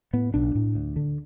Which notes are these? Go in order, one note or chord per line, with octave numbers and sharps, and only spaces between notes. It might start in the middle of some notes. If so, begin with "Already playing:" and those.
A2 B3
B1 D4
A2
D2
D3